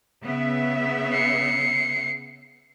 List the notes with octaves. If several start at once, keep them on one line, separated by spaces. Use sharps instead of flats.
C#3 B3 E5
C7 C#7